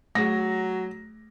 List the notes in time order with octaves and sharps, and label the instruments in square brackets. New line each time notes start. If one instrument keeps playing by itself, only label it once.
[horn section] F#3 [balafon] A3 G#4 [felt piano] A#6